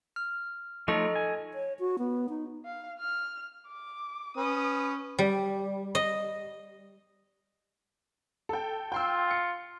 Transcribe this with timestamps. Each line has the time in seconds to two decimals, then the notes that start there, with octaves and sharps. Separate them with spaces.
0.16 F6
0.88 F3 A3 D#4 A4 C#5 D#5
1.15 G#5
1.54 C#5
1.79 F#4
1.98 B3
2.29 D#4
2.65 F5
2.99 F6
3.68 D6
4.37 C#4 B4 D#6
5.19 G3
5.95 D#5
8.49 A4 G5
8.92 F4 G5 C6 E6
9.31 C#7